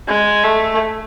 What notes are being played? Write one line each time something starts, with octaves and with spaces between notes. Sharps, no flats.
G#3
A3